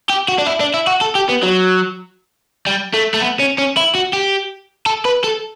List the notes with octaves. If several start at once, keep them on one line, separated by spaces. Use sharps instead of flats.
G4
F#4
D4
E4
D4
E4
F#4
A4
G4
B3
F#3
G3
A3
A3
B3
C#4
C#4
E4
F#4
G4
A4
B4
A4